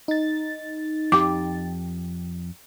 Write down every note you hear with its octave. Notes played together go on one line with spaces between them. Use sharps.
D#4 A6
F2 G4 D6